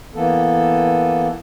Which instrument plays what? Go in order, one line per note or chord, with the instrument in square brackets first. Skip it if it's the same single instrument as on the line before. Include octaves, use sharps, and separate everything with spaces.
[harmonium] E3 A#3 B3 A4